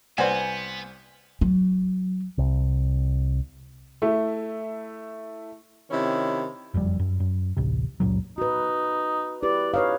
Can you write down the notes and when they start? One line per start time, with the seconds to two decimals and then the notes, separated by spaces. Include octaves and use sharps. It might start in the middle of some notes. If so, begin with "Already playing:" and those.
0.18 C2 B3 B4 C5 D5 F#5 G#5
1.41 F#3
2.38 C2
4.02 A3 E4
5.90 C3 D#3 C#4 E4
6.74 F#1 F2 A2 G3
6.99 F#2
7.20 F#2
7.57 A1 D2 C3
8.00 C#2 F#2 A#2 F#3
8.38 D#4 F#4 B4
9.43 E4 G4 B4 D5
9.74 D#4 B4 C#5 F5